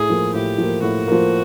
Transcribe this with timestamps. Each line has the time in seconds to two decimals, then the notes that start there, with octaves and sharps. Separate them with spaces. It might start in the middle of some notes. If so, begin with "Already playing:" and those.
Already playing: A2 G#4
0.09 F3 A#3
0.34 A2 G4
0.58 F3 A#3
0.82 A2 F#4
1.08 F3 A#3